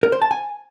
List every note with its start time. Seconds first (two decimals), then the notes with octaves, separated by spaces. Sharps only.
0.03 A#4
0.12 C5
0.22 A5
0.31 G#5